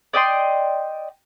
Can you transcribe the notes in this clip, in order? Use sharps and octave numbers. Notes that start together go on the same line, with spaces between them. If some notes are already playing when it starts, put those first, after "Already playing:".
D5 D#5 G5 C6